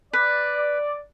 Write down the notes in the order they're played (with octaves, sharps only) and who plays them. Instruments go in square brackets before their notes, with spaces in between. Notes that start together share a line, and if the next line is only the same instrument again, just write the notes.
[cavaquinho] B4 [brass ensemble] D5